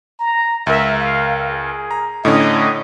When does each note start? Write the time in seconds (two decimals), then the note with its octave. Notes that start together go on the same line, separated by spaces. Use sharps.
0.20 A#5
0.67 C#2 A#4 E5
1.00 F5
1.48 G#4
1.91 A#5
2.25 A2 D3 C#4 D#5